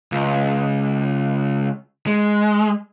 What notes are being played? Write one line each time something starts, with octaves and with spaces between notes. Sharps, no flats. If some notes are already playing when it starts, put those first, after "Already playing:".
C#2
G#3